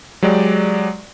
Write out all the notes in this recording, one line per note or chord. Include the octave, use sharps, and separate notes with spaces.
F#3 G#3 G4 D5